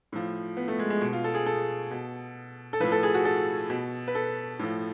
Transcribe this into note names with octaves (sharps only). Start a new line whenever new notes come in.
A2 F3
B3
A3
G#3
G#3
B2
F4
A4
G#4
A4
B2
A4
A2 F3 B4
A4
G#4
F#4
A4
B2
B4
A4
A2 F3